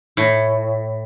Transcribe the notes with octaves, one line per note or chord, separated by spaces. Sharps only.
A2